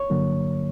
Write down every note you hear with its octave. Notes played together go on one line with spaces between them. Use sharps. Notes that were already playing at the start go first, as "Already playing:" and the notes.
Already playing: C#5
G2 D3 F#3 A#3